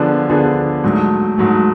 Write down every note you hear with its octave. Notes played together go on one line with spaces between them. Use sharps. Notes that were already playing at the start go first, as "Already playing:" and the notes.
Already playing: D3 F3 B3 D4 G#4
D3 F3 B3 D4 G#4
G#2 F#3 A3
G#2 F#3 A3